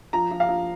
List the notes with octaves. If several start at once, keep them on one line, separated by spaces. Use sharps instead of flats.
F3 A#5
F3
F5
F3